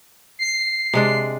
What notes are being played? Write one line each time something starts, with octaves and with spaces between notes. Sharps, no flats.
C7
C3 G#3 D4